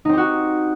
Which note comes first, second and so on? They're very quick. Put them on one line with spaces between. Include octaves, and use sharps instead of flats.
D#4 C4 G4 F#4